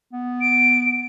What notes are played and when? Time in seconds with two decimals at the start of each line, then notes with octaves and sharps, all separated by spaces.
0.13 B3
0.41 D7